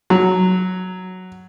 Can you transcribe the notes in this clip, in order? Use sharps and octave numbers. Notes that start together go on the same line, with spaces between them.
F#3